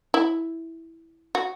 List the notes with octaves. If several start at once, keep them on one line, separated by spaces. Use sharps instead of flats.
E4
F#4